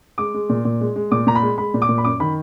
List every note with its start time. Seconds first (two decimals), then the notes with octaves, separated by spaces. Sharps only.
0.18 G#3 D6
0.34 G#3
0.49 A#2
0.65 A#2
0.81 G#3
0.96 G#3
1.12 A#2 D6
1.27 A#2 A#5
1.35 B5
1.42 G#3
1.58 G#3 B5
1.74 A#2
1.82 D6
1.89 A#2
1.98 B5
2.05 F#2 D6
2.20 D#3 B5